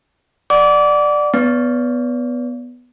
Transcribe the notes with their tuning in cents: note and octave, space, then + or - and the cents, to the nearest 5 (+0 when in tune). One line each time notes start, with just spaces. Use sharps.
D5 +15 F#5 +0 D6 -30
B3 +0 D5 -40